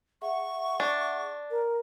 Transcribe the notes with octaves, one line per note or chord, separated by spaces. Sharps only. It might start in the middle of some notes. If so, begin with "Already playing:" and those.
G#4 E5 F#5 C#6
D4
A#4